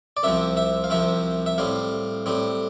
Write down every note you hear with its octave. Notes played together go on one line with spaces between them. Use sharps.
D5
C2 C3 F3 C4 E5
E5
F5
C2 C3 F3 C4 E5
E5
A2 G3 C4 F5
A2 G3 C4